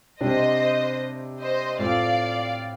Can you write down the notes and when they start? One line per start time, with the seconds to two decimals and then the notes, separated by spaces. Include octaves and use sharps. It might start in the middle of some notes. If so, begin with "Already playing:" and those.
0.21 C3 G3 D4 C5 D#5
1.39 C5 D#5
1.79 A2 A3 C4 F4 D5 F5